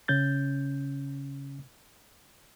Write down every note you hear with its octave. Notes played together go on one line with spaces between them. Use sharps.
C#3 C#4 G6 A6